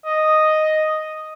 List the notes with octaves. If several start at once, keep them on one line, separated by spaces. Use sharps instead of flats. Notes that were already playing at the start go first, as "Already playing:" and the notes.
D#5